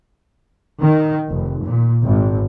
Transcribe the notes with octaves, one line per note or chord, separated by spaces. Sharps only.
D#3
F1
A#2
G#1